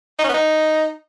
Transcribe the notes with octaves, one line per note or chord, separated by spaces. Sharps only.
D#4
C#4
B3
D#4